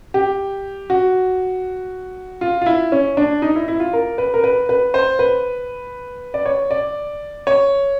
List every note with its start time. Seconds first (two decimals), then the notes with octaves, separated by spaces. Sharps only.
0.14 G4
0.90 F#4
2.41 F4
2.62 F4
2.66 E4
2.92 C#4
3.17 D4
3.42 D#4
3.55 E4
3.68 E4
3.80 F4
3.93 A#4
4.18 B4
4.34 A#4
4.44 B4
4.69 B4
4.94 C5
5.19 B4
6.34 D5
6.46 C#5
6.71 D5
7.47 C#5